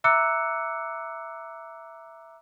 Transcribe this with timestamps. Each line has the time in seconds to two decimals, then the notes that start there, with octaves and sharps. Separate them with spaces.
0.04 E5 A#5 D6 E6 F#6 C#7